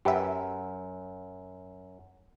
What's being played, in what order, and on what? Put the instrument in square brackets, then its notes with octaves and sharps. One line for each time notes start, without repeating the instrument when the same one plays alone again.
[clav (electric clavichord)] F#2 [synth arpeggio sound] G4 B4 E5